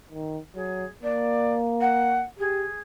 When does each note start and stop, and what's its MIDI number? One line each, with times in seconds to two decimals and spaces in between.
0.12 0.38 51
0.55 0.84 54
0.55 0.85 68
1.03 2.25 58
1.03 1.53 74
1.81 2.21 78
2.39 2.66 67
2.39 2.80 68